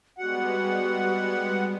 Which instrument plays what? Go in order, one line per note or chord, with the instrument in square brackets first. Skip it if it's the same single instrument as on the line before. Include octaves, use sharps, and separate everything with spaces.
[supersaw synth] G3 G#3 B3 [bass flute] F#4 [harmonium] F#5